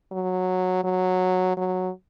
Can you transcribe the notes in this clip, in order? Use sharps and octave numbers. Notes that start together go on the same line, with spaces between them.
F#3
F#3
F#3